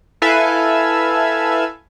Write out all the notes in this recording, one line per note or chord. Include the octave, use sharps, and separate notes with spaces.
E4 A4 B4 E5 F5 G#5